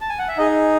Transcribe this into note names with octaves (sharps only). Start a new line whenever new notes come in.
A5
G#5
F#5
E5
D#4 G#4 D#5